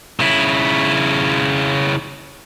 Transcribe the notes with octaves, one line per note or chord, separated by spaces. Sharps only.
C#3 E4